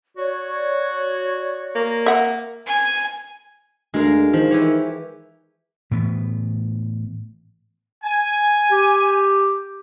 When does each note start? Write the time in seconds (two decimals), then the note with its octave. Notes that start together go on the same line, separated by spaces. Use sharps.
0.17 F#4 C#5 D5 C#6
1.75 A#3
2.06 E5 F#5
2.66 G#5
3.94 D2 G#3 A#4 F5
4.33 D#3 F3
4.50 E3 G4 C#5
5.91 A2 E3 B3
8.04 G#5
8.72 G4